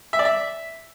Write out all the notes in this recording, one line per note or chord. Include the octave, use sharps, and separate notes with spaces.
E5
D5
E5